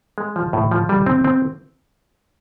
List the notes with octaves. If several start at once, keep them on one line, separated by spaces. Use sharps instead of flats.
G#3
F3
A2
F3
G3
C4
C4